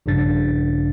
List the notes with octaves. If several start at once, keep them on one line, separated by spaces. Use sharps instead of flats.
A#1 G2 C#3 D4 A6